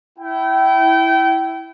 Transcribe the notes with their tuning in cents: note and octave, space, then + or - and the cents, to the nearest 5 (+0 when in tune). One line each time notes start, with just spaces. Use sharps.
E4 +0 G5 -30